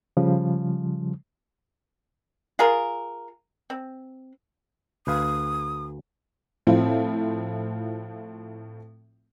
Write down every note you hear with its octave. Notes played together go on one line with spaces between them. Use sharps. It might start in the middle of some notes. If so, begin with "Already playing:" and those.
C#3 F3 G3
F4 G#4 A#4
C4
D2 B4 F5 D#6
A2 F3 C4 E4 F4